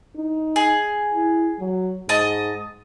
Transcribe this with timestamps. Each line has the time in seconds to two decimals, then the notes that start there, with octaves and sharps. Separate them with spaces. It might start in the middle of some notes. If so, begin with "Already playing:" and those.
0.16 D#4
0.56 G#4
1.13 E4
1.59 F#3
2.09 G#2 D#5 A5